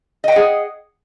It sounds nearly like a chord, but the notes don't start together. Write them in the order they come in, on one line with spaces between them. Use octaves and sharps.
D#5 G5 F#5 G#4